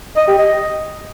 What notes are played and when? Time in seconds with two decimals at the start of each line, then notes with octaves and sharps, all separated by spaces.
0.17 D#5
0.27 G4
0.38 D#5